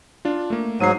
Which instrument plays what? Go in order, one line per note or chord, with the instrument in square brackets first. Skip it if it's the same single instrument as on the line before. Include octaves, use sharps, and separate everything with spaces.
[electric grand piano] D4 F4
A3 A#3
[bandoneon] G#2 F#3 [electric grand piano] C7 D#7